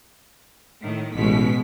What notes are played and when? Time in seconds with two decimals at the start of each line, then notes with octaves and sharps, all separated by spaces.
0.83 A2 D#3
1.16 A1 B2 G#3 B6